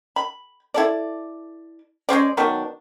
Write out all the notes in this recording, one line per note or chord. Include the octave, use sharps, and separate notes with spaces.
B5
E4 A4 D5
G#3 C#4 C5 D5
D#3 F#3 B3 D4